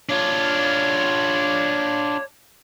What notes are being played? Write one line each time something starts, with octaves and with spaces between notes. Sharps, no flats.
D4 F4 C#5